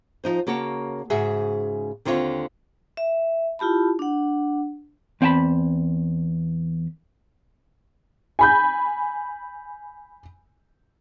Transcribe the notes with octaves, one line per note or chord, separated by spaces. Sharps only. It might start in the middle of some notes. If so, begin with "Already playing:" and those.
F3 D#4 C5
C#3 A#3 F#4 C#5 A5
G#2 C#3 F#4 G#4 E5
D#2 D3 C4 E4 F4 C#5
E5
E4 F4 G4 A5 B5
D4 F#5
E2 C4 F5 G5 A5 B5
G#5 B5 G6